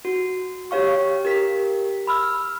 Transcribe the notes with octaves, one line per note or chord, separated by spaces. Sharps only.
F#4
G4 C#5 F5 C#6
G4 A#4 B6
B5 E6 F6